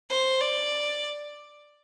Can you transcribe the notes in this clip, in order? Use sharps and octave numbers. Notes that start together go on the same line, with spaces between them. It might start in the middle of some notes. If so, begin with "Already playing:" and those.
C5
D5